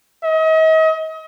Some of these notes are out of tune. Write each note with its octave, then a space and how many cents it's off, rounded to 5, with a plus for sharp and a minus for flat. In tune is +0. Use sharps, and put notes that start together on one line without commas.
D#5 +40